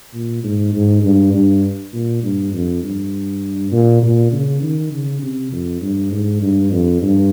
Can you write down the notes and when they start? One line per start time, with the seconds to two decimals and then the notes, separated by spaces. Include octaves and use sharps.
0.14 A#2
0.44 G#2
0.73 G#2
1.03 G2
1.33 G2
1.93 A#2
2.23 G2
2.53 F2
2.83 G2
3.72 A#2
4.02 A#2
4.32 C#3
4.62 D#3
4.92 C#3
5.22 C3
5.52 F2
5.82 G2
6.11 G#2
6.41 G2
6.71 F2
7.01 G2